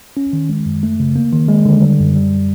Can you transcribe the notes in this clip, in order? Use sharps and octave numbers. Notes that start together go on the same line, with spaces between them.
C#4
D#3
G#3
F#2
A3
C#3
A#3
D#3
G#3
D3
G3
F#2
G3